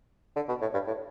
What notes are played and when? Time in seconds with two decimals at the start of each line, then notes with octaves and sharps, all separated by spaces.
0.36 D3
0.49 B2
0.62 A2
0.74 G2
0.87 A2